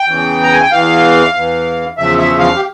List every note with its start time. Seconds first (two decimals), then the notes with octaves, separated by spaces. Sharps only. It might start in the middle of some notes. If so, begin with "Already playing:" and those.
Already playing: G5
0.08 E2 C#3 E3
0.43 A#5
0.52 G#5
0.62 G5
0.72 E2 E3 F5
1.34 E2 E3
1.98 E2 C#3 F3 E5
2.18 E5
2.39 F5
2.56 G4